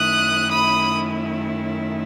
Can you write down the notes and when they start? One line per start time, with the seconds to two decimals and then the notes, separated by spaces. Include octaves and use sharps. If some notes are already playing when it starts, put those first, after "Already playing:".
Already playing: F#2 D#3 A3 E4 D#6 F#6
0.51 B5 D#6